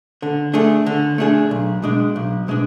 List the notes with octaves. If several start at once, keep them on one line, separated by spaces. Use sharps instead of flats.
D3
A3 D4 G#4
D3
A3 D4 G#4
B1
B2 G#3 D4
B1
B2 G#3 D4